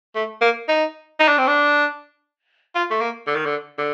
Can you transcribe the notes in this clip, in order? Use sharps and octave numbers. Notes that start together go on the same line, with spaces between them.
A3
A#3
D#4
D#4
D4
C4
D4
F4
A3
A#3
D3
D#3
D3
D3